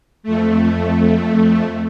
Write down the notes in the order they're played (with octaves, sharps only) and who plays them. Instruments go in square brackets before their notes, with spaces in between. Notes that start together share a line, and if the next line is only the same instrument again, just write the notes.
[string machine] F2 A3